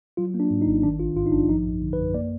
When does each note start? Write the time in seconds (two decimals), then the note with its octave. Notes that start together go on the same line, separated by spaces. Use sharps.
0.17 F#3 F4
0.34 A#3
0.40 D4
0.50 G#2
0.62 D#4
0.67 G#1
0.83 D#3 D4
0.99 A#1 F4
1.16 G#2 F4
1.26 D#4
1.32 A#1 D4
1.49 F3 D#4
1.65 F#2
1.82 D3
1.93 B4
1.98 F#2
2.14 A#3 D5